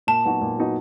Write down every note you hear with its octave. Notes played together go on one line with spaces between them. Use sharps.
A#2 A5
F#3 B3 D#4 F#4
A#2
F#3 B3 D#4 F#4